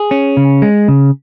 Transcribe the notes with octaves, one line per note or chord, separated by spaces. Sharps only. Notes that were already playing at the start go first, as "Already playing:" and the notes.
Already playing: G#4
C#4
C#3
G#3
C#3